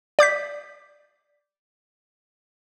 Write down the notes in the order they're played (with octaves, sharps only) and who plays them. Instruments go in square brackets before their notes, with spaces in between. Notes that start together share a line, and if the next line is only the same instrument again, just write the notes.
[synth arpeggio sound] D5 D6 G6 B6